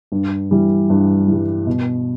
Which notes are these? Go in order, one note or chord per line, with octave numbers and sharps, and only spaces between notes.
G2
E3 G3
G2
E3 G3
B2